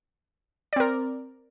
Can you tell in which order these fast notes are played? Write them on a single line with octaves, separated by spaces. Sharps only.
D5 C4 A#4